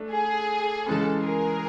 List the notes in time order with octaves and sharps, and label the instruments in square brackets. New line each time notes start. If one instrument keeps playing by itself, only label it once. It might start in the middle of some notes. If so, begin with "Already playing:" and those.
Already playing: [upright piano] A3 D4
[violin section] G#4
[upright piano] C#3 E3 G#3 C#4 [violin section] A4
[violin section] G#4 A#4